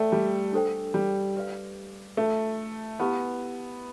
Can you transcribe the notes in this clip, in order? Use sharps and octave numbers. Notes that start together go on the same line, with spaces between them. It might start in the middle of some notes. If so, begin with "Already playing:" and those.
Already playing: A3 A4 D5 G5
G3
D4 A4 C5 G5
G3
G4 B4 D5 F5
A3 D4 F4 A4
B3 E4 G4 B4 F5